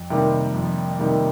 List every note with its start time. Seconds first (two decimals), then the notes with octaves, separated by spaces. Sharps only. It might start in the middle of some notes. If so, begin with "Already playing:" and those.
Already playing: F2
0.10 C3 D#3 G3 A#3
0.54 F2
0.99 C3 D#3 G3 A#3